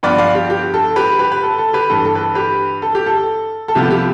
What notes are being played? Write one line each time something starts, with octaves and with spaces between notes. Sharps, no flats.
G2 F3 B3 B4 D5
D5 F5
G4
G4
A4
G4 B4
G4 B4
B4
A4
A4
G4 B4
G2 E3 A3 A4
A4
B4
A4
G4 B4
A4
G4
A4
A4
C2 C3 F3 B3 G4
G4